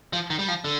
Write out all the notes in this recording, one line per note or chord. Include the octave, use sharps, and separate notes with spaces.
F3
D#3
G3
F3
D3